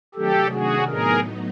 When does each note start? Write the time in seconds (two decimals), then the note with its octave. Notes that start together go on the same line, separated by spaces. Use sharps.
0.15 C3 D#3 F#3 A3 D4 G4 A4
0.51 F#4 G#4
0.87 A2 F#3 B3 D#4 G#4 A#4